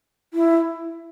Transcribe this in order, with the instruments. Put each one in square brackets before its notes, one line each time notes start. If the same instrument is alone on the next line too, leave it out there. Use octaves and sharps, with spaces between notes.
[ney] E4